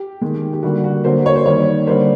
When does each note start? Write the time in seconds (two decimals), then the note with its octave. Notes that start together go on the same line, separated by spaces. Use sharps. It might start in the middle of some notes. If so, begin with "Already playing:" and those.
Already playing: G4
0.21 D#3 G#3
0.53 G4
0.63 D3 G3 A#3 F#4
0.84 F#4
1.04 D3 F#3 A#3 C5
1.26 C#5
1.36 C5
1.46 D#3 G3 A#3 C#5
1.87 D3 G3 A#3 C5